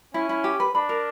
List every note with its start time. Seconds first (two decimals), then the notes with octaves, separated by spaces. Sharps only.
0.14 C#4 E4
0.29 E4
0.44 G4
0.60 B4
0.75 D4 B5
0.89 A#4